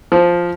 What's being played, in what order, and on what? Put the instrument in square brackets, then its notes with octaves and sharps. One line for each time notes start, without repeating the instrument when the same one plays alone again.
[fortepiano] F3